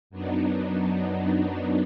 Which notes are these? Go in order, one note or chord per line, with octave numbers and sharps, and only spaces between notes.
F#2 F#3 B3 D4 D#4